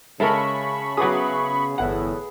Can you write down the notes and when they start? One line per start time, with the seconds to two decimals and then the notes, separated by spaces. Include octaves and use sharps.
0.20 C#3 G#3 A4 A#4 E5 A5 B5 C#6
0.97 F#3 B3 G#4 D6 D#6
1.78 G1 E2 A2 E4 F#5